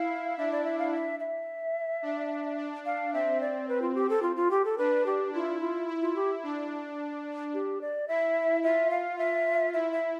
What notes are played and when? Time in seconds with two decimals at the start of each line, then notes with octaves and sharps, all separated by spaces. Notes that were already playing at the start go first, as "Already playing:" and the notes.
Already playing: E4 F5
0.38 D4 E5
0.52 D5
0.65 E5
0.79 F5
0.93 E5
1.20 E5
2.02 D4
2.58 D4
2.86 F5
3.13 C4 E5
3.41 D5
3.68 B4
3.82 F4
3.95 G4
4.09 A4
4.23 F4
4.36 F4
4.51 G4
4.65 A4
4.78 D4 B4
5.06 G4
5.33 E4 F4
5.60 F4
5.88 E4
6.02 F4
6.16 G4
6.43 D4
7.54 G4
7.81 D5
8.08 E4 E5
8.63 F4 E5
8.91 F5
9.18 F4 E5
9.74 E4 E5
9.92 E5